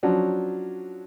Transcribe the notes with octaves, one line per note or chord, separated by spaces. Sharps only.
F3 F#3 C#4 D4